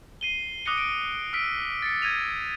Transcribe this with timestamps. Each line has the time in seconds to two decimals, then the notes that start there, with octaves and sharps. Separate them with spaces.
0.21 C7 D#7 G7
0.66 D6 D#6 F#6 A#6 C#7 G7
0.78 D7
1.33 E6 F6 B6 D7
1.82 A6 C#7
2.02 G#6 A#6 D#7 F7